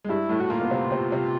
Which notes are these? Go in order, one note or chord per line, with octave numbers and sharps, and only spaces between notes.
G#3
G2 G3 E4
A2 A3
F#4
A#2 A#3 F4
B3
C3 C4
C3 C4
C3 C4